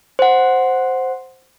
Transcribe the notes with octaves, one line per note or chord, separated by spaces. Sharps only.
C5 F#5